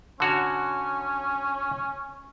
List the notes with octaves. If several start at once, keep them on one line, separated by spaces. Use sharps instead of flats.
D3 C#4 F#4 C#5